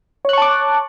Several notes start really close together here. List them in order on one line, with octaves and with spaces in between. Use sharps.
C#5 F#6 C#6 A5 D6